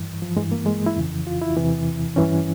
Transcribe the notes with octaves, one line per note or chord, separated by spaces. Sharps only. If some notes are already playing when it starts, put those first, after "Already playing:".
Already playing: G2 E3
F3
G2 E3 G#3
A#3
G#3
E4
F2 C#3 E3
F4
E4
E2 C3 E3
G2 E3 C#4